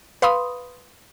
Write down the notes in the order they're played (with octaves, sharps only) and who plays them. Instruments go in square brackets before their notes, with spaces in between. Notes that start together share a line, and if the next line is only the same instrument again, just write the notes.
[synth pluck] B4 F5 B5 C6 D#6